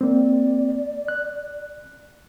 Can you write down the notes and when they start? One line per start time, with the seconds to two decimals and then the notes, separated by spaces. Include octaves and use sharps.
0.01 A#3 C4 D5
1.08 F#6